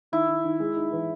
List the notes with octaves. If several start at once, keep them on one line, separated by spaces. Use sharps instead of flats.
D#3 E4
D#3
D#3
G#3
D#4
E3